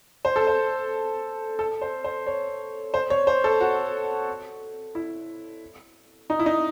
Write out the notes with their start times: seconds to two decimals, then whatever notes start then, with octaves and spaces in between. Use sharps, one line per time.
0.25 C5
0.36 A4
0.47 C5
1.59 A4
1.82 C5
2.04 C5
2.27 C#5
2.94 C5
3.10 C#5
3.27 C5
3.44 A4
3.61 F#4
4.95 E4
6.30 D#4
6.40 E4
6.46 D#4